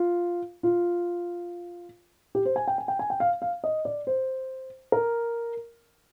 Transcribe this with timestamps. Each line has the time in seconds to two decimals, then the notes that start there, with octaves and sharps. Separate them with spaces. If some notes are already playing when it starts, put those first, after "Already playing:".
Already playing: F4
0.63 F4
2.35 G4
2.45 C5
2.56 G#5
2.68 G5
2.78 G#5
2.88 G5
2.99 G#5
3.10 G5
3.20 F5
3.42 F5
3.64 D#5
3.85 D5
4.07 C5
4.92 A#4